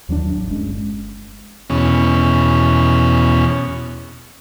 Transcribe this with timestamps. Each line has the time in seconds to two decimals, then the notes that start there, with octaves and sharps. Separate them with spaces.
0.09 D#2 F#3 G3 D4
0.32 A1
0.50 G1 G#3 C#4
1.70 E2 B2 C#4